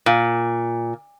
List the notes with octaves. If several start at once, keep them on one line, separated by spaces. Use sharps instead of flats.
A#2